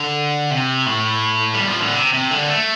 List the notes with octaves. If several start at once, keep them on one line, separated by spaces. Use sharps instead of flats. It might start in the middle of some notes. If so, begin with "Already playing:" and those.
Already playing: D3
C3
A2
G3
F3
D3
C3
C3
D3
A3